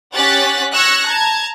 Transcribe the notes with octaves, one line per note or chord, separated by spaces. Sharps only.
C#4 G4 F#5 F#6 A6 B6
C#6 E6 F#6 G#6 A#6 C#7
A5 A#5 G#6